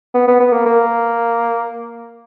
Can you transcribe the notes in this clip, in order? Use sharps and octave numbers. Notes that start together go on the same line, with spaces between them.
B3
B3
B3
A#3
A#3